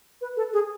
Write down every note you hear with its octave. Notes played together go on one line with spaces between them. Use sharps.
B4
A4
G#4